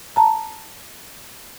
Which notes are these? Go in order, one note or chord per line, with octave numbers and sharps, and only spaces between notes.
A5 A#5